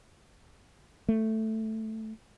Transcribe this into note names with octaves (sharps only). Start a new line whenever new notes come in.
A3